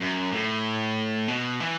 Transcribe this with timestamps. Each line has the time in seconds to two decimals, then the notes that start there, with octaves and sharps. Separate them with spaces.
0.01 F#2
0.32 A2
1.28 B2
1.60 E3